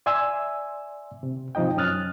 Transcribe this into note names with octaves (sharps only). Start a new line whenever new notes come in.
D5 E5 G#5 C6 E6
C3
C3 F3 D#4 D#5 G5
F#2 C#4 D#6 F6 F#6 A6